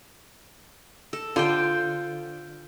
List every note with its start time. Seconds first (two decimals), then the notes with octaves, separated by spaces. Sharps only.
1.13 A4
1.36 D3 F4 C5 G5